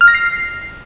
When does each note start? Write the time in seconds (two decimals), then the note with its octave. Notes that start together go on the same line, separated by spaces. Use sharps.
0.01 F6
0.08 A#6
0.14 C7